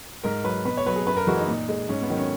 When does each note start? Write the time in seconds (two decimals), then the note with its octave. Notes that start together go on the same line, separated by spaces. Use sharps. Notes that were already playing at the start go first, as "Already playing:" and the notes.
0.24 G#2 A#4
0.44 F#3 B4
0.65 B2 B4
0.77 C#5
0.86 F#3 B4
0.96 G#4
1.07 F#2 B4
1.17 A#4
1.27 E3 G#3 F#4
1.38 D#4
1.48 A#2
1.69 G#3
1.89 G#2 C#4
2.02 B3
2.10 D#3 F#3
2.17 C#4